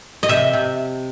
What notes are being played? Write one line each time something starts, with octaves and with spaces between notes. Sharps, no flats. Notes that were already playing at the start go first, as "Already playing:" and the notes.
D#5
C3 E5
C3